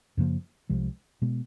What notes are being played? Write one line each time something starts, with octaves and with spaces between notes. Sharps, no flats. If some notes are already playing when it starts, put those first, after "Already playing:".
F#2 C#3 F3 A#3
C2 C3 F3 G#3
B2 G#3 B3